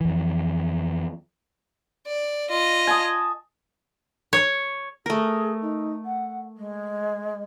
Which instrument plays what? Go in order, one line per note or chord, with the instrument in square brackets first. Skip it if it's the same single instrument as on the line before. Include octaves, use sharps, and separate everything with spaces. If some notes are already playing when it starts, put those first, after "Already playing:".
[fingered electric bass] F2 E3
[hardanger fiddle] D5
F4 D#5
[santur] G#5 A5 D#6
[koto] C#5
[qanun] A3 A#4 [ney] G#4
[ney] D#4
F#5
G#3